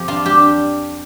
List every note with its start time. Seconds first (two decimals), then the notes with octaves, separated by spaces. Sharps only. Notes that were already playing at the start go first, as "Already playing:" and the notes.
Already playing: F2 F3 G4
0.08 D4 F4
0.26 D4 G4